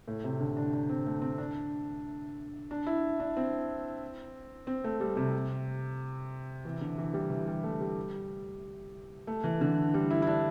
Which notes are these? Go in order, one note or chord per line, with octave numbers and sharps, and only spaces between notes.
A2
C3
D3
D4
D4
C4
A3
C4
D4
D4
E4
D4
C4
C4
A3
G3
C3
E3
D3
E3
G3
E3
G3
A3
G3
A3
E3
D3
G3
E4
E4
D4